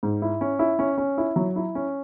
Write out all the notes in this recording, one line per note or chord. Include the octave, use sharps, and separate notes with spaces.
G#2
E4
C#4
E4
C#4
C#4
E4
F#3
E4
C#4